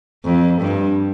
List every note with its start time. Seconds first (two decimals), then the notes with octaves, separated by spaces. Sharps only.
0.24 F2
0.61 G2